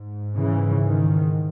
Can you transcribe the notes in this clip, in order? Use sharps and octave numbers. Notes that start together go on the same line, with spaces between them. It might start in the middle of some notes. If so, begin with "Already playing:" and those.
Already playing: G#2
C#3 E3
D#3